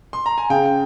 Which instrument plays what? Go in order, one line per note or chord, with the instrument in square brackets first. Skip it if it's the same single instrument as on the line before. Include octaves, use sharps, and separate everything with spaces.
[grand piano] C6
A#5
G#5
[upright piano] C#3 [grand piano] G5